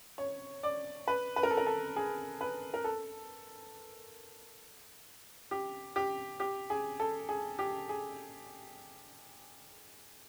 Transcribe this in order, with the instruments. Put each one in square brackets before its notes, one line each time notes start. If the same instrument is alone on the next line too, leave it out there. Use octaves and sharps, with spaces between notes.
[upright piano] C#5
D5
B4
B4
A#4
A4
A#4
A4
G#4
B4
A#4
A4
G4
G4
G4
G#4
A4
G#4
G4
G#4